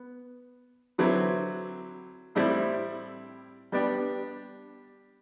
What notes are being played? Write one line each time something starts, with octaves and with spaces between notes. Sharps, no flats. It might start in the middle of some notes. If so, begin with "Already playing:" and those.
Already playing: B3
D3 F#3 C4 E4 B4
A2 G3 C4 E4
G3 B3 D4 G4